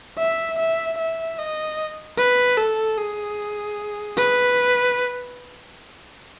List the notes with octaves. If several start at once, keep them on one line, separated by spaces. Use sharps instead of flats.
E5
E5
E5
D#5
B4
A4
G#4
B4